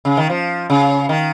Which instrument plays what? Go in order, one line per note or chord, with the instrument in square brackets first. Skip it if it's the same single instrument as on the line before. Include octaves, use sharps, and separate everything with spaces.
[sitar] C#3
D#3
F3
C#3
D#3